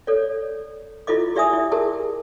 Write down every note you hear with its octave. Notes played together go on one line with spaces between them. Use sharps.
A4 C#5 D5
E4 F4 A4 D#5 D6
G4 D5 E5 G#5 D#6
E4
G4 G#4 A#4 A5